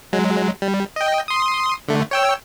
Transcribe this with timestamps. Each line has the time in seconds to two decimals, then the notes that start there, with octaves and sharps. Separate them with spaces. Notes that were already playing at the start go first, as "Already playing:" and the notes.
0.13 F#3 G#3
0.62 G3
0.96 D#5 G5
1.28 C6 D#6
1.88 D3 A3
2.11 C#5 G5 E6